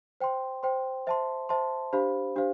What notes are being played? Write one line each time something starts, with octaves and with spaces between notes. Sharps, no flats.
C5 G5 C6
C5 G5 C6
C5 E5 A5 C6
C5 E5 A5 C6
D4 G4 C5 F5 B5
D4 G4 C5 F5